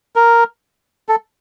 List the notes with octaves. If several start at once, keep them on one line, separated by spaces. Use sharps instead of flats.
A#4
A4